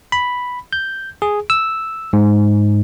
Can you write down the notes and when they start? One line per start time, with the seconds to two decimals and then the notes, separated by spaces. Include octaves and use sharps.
0.12 B5
0.73 G6
1.22 G#4
1.50 E6
2.13 G#2